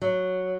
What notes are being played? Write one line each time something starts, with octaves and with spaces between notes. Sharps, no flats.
F#3